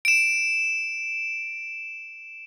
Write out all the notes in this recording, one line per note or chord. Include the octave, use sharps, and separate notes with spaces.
D7 E7